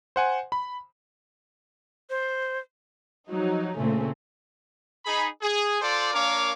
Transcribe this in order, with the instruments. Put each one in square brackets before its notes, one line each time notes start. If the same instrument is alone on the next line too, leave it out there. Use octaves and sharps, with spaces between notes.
[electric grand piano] C5 F#5 G#5
B5
[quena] C5
[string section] F3 F#3 D#4
A#2 C#3 A3 C4 C#4
[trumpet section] D#4 G#4 B5
G#4
F4 A4 C5 D5
A#3 D4 A#4 C#5 F5 D6